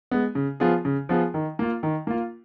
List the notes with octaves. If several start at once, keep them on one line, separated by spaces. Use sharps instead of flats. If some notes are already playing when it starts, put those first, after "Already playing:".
G#3 B3
C#3
F3 B3 F4 G#4
C#3
F3 B3 F4 G#4
D#3
A#3 F4
D#3
A#3 F4